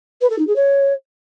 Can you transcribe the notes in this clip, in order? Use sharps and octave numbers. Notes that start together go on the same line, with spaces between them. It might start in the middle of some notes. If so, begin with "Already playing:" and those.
B4
A4
D#4
G#4
C#5